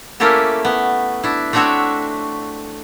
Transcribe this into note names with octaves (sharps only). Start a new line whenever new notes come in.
A3 A#3 C#4 E4 G4 A4
B3
D4 E4
A3 C4 D4 F#4 C#5 E5